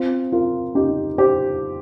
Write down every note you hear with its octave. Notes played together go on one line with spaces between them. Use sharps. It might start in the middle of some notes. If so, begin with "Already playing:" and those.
Already playing: C4 F4
F4 A#4
D#4 G4
G4 C5